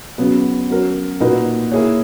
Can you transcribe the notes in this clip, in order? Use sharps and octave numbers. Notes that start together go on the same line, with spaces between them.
C#3 F#3 B3
F#3 C#4 F#4 A#4
A#2 A#3 D#4 F#4 B4
A#3 E4 G#4 C#5